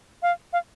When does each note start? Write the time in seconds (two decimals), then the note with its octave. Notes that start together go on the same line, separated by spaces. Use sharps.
0.23 F5
0.53 F5